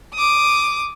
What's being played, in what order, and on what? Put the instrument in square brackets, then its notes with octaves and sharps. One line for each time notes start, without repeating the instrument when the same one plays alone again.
[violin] D6 D#6